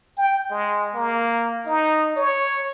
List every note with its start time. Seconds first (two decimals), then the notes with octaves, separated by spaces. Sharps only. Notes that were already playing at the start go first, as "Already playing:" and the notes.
0.18 G5
0.50 G#3
0.95 A#3
1.66 D#4
2.16 C#5